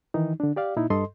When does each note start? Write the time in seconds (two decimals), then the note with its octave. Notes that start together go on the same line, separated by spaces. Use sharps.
0.14 D#3 E3 D#4
0.40 D3 D4
0.56 G4 D5 F5
0.77 A#2 D#4 E4
0.90 G2 A4 D#5 C6